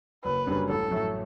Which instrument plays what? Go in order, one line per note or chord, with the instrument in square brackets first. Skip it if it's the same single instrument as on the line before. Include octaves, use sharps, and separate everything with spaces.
[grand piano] F#1 [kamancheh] B4
[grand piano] F#2 D3 G3 C#4
[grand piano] A1 [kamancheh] A4
[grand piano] A2 F#3 A3 E4